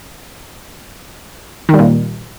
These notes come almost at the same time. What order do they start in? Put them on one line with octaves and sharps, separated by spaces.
D#3 G3 A#2